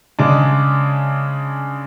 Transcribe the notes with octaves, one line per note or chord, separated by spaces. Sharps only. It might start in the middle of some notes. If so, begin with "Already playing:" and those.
C#3 G#3 D4